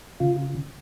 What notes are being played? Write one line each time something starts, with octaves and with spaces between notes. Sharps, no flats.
C#3 F4